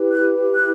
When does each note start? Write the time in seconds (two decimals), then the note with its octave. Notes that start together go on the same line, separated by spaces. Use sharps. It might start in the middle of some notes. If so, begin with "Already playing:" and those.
Already playing: E4 G4 B4
0.12 F#6
0.55 F#6